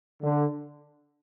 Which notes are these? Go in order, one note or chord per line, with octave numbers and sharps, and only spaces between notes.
D3